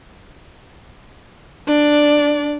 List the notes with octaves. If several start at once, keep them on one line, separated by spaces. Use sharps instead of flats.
D4 D5